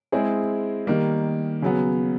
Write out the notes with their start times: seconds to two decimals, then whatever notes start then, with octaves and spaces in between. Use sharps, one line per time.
0.12 G#3 C4 E4 G#4
0.87 D#3 G3 A#3
1.62 C#3 F#3 B3